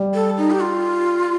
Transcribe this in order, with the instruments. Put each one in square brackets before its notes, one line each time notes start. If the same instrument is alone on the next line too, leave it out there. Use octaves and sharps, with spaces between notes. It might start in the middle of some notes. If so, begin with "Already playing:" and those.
Already playing: [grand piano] G3
[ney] A4
D#4
G4
F4